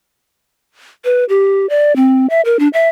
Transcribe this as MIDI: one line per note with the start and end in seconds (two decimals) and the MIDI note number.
1.05 1.25 71
1.29 1.68 67
1.69 1.95 74
1.96 2.27 60
2.30 2.41 76
2.45 2.57 70
2.59 2.68 62
2.73 2.89 76